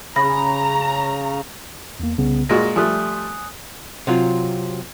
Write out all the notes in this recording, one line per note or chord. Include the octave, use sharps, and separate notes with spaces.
C#3 A#5 B5 A#6
E2 A#3
C2 C#3 B3
A#2 G#3 F#4 A#6
F3 G3 A3 G#5 D#6 F#6
C3 F#3 F4